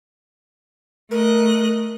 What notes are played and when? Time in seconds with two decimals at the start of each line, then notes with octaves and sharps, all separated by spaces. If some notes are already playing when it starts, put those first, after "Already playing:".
1.11 A3 A#4 D#5 F#6